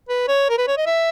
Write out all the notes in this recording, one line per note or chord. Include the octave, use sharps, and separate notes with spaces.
B4
C#5
A#4
B4
C#5
D#5
E5